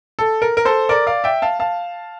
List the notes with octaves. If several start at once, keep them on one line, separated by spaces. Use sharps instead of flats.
A4
A#4
A#4
A4 C5
A#4 D5
D5 F5
E5 G5
F5 A5
F5 A5